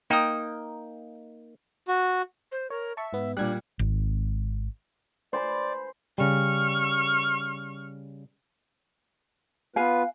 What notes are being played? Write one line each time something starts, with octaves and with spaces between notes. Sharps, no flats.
A#3 D#4 G5 D#6
F#4
C5
A#4 C#5
E5 A5 C#6
G#2 B3
A#2 G3 D4 F#6 G#6
G#1
C5 D5 G#5 B5
C#3 G3 C#6 F6
B3 F4 B4 F5 G#5